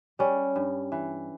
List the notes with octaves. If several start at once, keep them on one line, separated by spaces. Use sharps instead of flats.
G3 C#4
G2
E3